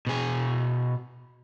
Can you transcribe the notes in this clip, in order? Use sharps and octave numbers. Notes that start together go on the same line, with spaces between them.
B2 G#4